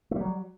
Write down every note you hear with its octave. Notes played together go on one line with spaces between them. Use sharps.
F#3 G3 A3